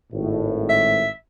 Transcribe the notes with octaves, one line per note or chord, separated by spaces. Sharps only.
G#1 A2
E5